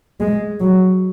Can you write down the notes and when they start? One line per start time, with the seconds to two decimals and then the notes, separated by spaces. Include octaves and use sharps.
0.20 G#3
0.60 F#3